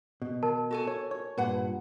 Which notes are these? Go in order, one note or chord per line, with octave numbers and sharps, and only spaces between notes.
B2
A#4 A5
F#4 A4 G#5
C#5
C#5
G2 A#2 B4 F#5